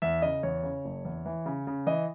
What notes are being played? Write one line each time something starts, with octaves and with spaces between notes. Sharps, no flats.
E2 E5
C#3 D#5
E2 C#5
C#3
F#1
E2
E3
C#3
C#3
E3 D#5